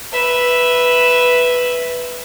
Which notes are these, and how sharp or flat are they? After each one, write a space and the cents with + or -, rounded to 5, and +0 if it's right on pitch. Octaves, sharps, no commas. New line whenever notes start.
B4 +0 E5 +0